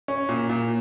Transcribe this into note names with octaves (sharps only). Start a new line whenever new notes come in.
C#4
A#2
A#2